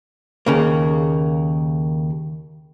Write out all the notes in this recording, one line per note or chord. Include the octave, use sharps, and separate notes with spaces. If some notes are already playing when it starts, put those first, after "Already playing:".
D#2 C#3 A#3